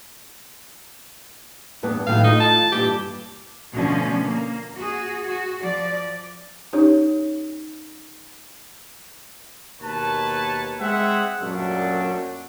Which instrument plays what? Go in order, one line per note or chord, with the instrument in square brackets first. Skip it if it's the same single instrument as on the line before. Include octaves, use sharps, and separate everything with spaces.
[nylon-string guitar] E2 G2 B3
[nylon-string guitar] A2 D#3 F#3 [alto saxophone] F5
[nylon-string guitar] A3 F4 [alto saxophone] D#4
[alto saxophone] A5
[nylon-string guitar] G2 A#2 E3 [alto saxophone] G4
[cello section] B2 D3 F3 A3 C4 C#4
A#3
F#4 G#4
F#4
F3 D5
[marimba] C#4 D#4 G4 C#5
[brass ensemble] D#2 B2 A#4 B4 C#5 A5
G#3 C4 G#4 E5 F#5
F#2 A#2 F#3 G3 A3 D4